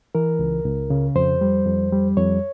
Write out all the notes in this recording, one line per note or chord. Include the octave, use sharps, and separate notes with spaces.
E3 A#4
C#2
C#2
C#3
F2 C5
G3
F2
G3
F2 C#5